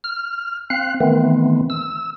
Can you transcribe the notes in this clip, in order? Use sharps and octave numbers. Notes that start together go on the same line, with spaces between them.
F6
C4 F5 F#6
D#3 E3 A3 B3 C4
E6